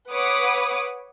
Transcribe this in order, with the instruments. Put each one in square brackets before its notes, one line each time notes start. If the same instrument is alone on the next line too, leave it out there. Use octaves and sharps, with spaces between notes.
[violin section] B4 C#5 F#5 B5 D6 D#6